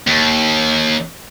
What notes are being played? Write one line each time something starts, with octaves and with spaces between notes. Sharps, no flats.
D#2